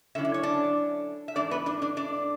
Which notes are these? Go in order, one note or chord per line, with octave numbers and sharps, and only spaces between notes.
D3 F#3 C#4 E4 E5
D5
C#5
D4 D5
E5
G#2 E3 A3 D4 D5
B3 B4
D4 D5
D4 D5
D4 D5